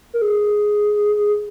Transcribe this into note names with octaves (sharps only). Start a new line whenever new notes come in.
A#4
G#4